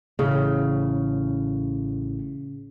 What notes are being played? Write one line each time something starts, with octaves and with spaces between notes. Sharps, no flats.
A1 A2 C#3